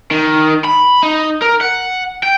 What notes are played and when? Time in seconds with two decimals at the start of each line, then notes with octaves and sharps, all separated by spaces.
0.11 D#3
0.64 B5
1.03 D#4
1.42 A#4
1.61 F#5
2.23 G5